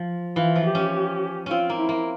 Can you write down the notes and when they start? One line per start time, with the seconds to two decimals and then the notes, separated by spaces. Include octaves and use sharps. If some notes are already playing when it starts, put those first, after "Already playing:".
Already playing: F3
0.36 E3 F4
0.56 F3
0.65 G4
0.75 C#4
1.46 C4 C#4 F4
1.70 A#3
1.79 E4
1.89 A#3